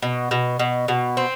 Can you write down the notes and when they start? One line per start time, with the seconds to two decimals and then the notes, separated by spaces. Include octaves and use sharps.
0.02 B2
0.31 B2
0.59 B2
0.88 B2
1.17 C4